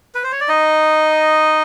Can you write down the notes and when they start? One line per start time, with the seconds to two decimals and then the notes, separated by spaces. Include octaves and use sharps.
0.15 B4
0.23 C5
0.32 C#5
0.40 D5
0.48 D#4 D#5